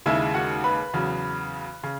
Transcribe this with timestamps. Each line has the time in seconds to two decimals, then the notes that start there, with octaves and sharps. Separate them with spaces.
0.06 D#2 C#3 G#3 E4 E5
0.34 F#4 F#5
0.64 B4 B5
0.94 E2 C#3 F#3
1.83 C#3